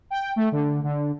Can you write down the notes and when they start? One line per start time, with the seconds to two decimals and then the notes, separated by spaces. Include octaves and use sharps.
0.10 G5
0.36 A3
0.52 D3
0.84 D3